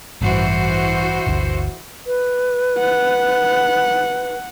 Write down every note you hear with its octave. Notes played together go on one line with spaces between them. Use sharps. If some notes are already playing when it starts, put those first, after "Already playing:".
A1 G2 E3 F#4 C5
G1 D2
B4
F#5